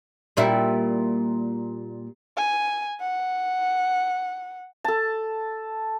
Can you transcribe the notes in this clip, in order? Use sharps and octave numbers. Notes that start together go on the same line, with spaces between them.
A#2 G3 E4
G#5
F#5
A4 A5